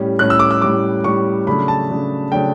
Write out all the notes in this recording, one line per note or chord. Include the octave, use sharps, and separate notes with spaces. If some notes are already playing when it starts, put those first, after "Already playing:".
Already playing: A2 G3 C#4
A2 G3 C#4 F#6
E6
D6
E6
A2 G3 C#4 D6
A2 G3 C#4 C#6
C#3 F#3 A3 D4 B5
A5
C#3 F#3 A3 D4
C#3 F#3 A3 D4 G5